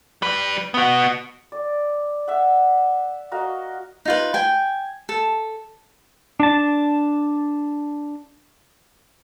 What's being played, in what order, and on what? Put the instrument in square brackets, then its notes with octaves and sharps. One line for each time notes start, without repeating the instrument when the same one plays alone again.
[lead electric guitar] G3 B4
B3 F#4
[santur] D5
E5 F#5
F#4 A#4 D#5 F5
[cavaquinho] D#4 F4 B4
G5 G#5
A4
[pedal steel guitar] D4 A5